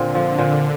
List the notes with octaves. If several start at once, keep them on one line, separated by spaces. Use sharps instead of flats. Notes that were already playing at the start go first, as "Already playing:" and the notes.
Already playing: A#2 D3 C4
F3
A#2